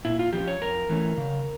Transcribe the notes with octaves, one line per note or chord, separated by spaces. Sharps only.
A#2 E4
F4
F3 A#3 C#4 G4
C#5
F2 A#4
E3 A3 C#4
C#3